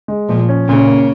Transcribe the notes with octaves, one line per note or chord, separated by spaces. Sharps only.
G#3
A#2 F3
C#4
A#2 C#3
A#3